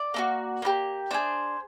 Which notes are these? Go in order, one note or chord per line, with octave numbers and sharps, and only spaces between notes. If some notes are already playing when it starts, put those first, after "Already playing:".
Already playing: D5
A#3 D4 F#4
A#3 D#4 G4
D4 F4 G#4 C5